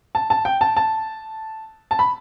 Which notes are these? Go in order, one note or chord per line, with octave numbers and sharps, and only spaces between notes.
A5
A5
G5
A5
A5
A5
B5